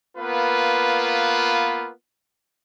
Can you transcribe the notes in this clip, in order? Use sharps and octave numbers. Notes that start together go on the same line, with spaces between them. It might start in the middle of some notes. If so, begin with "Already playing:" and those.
A#3 B3 F4 B4